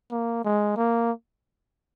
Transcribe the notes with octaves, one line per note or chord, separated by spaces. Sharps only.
A#3
G#3
A#3